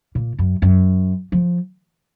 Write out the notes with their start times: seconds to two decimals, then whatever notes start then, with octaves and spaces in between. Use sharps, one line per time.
0.15 A#2
0.39 F#2
0.62 F#2
1.32 F3